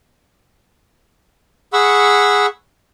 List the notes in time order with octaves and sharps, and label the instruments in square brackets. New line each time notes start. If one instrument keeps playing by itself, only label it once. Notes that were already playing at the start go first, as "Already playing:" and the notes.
[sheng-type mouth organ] G#4 F#5 B5 C#6 E6